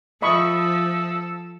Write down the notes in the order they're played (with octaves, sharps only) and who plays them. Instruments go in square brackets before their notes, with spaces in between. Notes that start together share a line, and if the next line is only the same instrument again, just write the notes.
[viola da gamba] F3 [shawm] A4 [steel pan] D#5 B5 C#6 [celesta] E5 D#6